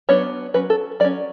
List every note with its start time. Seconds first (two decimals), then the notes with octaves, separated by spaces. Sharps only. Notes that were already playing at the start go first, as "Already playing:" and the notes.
0.09 F#3 B3 D4 C#5
0.54 F#3 C#4 B4
0.70 A4
1.00 F#3 D5
1.04 C#4